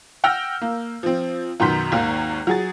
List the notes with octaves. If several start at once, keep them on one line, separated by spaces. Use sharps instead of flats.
F#5 G5 E6 F6 G6 A#6
A#3
F3 C4
F#2 B2 D#3 C6 G6 B6
G#1 D#2 A#3 A#5
F#3 G#4 A6